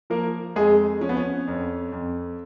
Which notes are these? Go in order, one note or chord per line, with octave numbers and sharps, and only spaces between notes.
F3 A#3 A#4
F2 G#3 G#4
F3 C#4
B3
C#4
F2
F2